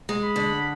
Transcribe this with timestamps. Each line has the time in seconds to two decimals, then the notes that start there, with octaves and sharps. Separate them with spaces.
0.09 G#3
0.23 B5
0.36 D3